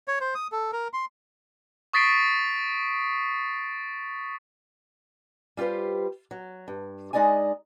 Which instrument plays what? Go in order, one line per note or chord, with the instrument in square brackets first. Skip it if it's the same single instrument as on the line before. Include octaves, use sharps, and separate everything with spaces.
[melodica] C#5
C5
D#6
A4
A#4
C6
[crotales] C#6 D#6 A6 B6 C7 D7
[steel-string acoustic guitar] G3 F4 G4 B4 C5
F#3
G2
G#3 D#4 D5 D#5 G#5